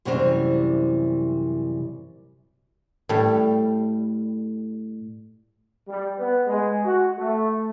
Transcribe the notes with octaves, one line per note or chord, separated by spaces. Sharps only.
F#2 C3 E3 G3 C4 C5
A2 G3
G3
B3
G#3
F#4
A3